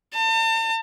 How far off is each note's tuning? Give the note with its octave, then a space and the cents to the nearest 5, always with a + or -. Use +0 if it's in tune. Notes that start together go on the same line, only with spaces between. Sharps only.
A5 +40